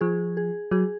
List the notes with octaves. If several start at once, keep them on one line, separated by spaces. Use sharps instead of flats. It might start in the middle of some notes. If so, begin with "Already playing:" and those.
F3 G#4
G#4
F#3 G#4